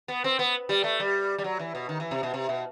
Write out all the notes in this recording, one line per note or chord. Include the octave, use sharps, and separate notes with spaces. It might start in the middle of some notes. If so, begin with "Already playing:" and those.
B3
C4
B3
G3
A3
G3
G3
F#3
E3
B2
D#3
E3
C3
B2
C3
B2